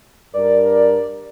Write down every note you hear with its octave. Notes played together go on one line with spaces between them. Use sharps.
G2 A#4 D5